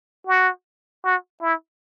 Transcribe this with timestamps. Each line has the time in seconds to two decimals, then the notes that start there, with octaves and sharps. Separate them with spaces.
0.27 F#4
1.04 F#4
1.42 E4